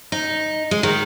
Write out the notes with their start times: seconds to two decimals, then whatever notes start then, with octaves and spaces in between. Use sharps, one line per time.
0.12 D#4
0.71 G#3
0.83 D#3